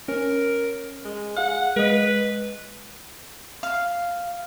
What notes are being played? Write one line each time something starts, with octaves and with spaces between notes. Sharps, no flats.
C#4 A#4
G#3
G#4 F5 F#5
G#3 B4 D#5
F5